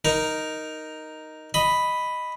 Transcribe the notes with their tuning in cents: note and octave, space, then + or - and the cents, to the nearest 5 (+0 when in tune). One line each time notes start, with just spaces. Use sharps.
D#4 +0 A#4 +0
D#5 +0 B5 +0